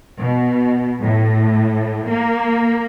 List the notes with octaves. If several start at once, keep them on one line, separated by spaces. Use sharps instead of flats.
B2
A2
A#3